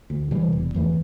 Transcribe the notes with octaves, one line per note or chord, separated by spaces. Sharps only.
D2
C3 E3 G3
E1
E2 E3 A3